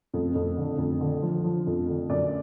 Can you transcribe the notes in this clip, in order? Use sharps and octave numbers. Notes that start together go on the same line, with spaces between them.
F2
F2
D3
F2
D3
F3
F3
F2
D3
F#2 D5